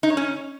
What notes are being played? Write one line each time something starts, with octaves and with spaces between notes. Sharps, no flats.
D#4
C#5
C#4